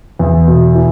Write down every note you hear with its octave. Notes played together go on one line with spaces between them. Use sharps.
E2
B2
E4